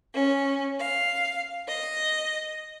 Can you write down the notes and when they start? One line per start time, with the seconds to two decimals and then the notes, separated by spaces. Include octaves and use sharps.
0.14 C#4
0.79 F5
1.67 D#5